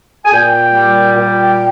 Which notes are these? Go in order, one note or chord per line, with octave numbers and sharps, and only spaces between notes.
G#5
A#2 G5
G3
A#2 G5